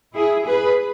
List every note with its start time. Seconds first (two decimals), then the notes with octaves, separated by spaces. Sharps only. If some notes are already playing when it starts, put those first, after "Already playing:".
0.15 E4 G#4
0.46 G#4 B4